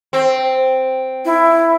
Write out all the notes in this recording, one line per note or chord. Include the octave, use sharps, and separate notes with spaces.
C4
E4